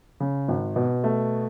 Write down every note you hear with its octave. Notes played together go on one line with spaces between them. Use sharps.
C#3
G#1
B2
A3